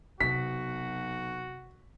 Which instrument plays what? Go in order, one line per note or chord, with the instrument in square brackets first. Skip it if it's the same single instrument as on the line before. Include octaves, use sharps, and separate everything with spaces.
[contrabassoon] B1 [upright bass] C3 [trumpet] F#4 [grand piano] B6